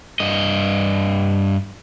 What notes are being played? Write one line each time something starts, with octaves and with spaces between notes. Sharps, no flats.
G2 D#5